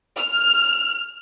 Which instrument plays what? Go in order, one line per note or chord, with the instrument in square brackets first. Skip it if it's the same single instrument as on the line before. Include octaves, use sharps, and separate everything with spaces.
[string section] F6